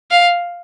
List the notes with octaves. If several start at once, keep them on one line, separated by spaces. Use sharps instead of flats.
F5